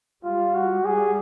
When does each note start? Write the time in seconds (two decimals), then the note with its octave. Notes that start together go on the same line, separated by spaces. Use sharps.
0.24 G3 F4
0.55 F#4
0.85 G3 G#4